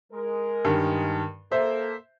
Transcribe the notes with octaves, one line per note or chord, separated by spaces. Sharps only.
G#3 A#4
G2 D#3
A#3 A4 C5 E5